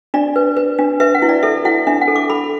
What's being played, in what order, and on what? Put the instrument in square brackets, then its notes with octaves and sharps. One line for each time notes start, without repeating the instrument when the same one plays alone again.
[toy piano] D4 D5
B4
B4
D4
B4 E5
F#5
E4
D5
A4 E5
E4 F#5
D4 E5
F#5
A4
D6
A4 B5